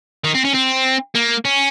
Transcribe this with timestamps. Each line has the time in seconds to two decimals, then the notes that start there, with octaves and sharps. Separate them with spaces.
0.24 D#3
0.35 C4
0.45 C#4
0.54 C4
1.15 A#3
1.45 C#4